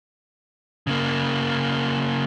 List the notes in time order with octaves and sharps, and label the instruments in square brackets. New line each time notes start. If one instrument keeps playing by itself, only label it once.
[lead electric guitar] C#3 A#3